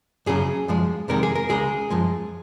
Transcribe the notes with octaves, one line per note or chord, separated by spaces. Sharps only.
F#2 C#3 F#3 G#4
F#2 F3 G#3
F2 C3 D#3 G#3 A#4
G#4
A#4
C#2 C#3 G#3 G#4
F#2 F3 G#3